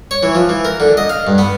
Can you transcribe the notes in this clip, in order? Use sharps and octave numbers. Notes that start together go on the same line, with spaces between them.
C#5
E3
F3
E3
A#4
D3
D#5
F5
G2
B3